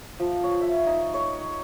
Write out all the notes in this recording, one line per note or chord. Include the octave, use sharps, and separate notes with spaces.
F3
C#5
E5
D#4
C#5